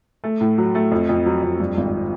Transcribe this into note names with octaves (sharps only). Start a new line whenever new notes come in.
A3
A2
F#3
A3
F2
F2
F#3
F2
G2
G#1